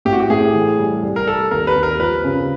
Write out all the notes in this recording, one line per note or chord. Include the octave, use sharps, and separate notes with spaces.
A2 G4
F#4
G4
A2 G#4
E3
G3
C2
A#4
C2 A4
D#2 A#4
B4
D#2
A#4
F3 B4
C#3